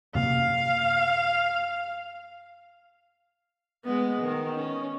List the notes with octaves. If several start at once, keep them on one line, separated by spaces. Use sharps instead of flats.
F#2 C3 A#3 F5
G#3 B3
D#3
C#4